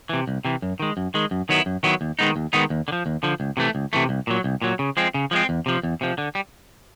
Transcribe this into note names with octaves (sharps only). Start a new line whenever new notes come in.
C3 E3
C2
C3 E3
F#2
D#3 G#3
F#2
D#3 G#3
F#2
D#3 F#3 B3 E4
F#2
D#3 F#3 B3 E4
D#2
D#3 G#3 B3 D#4
D#2
D#3 G#3 B3 D#4
D#2
D3
F3
D#2
D3 F3
C#2
C3 E3 A3
C#2
C3 E3 A3
C2
A#2 F#3
C2
A#2 F#3
C#3
F3 G#3 C4
C#3
F3 G#3 C4
E2
C3 F3
E2
C3 F3
D3
G3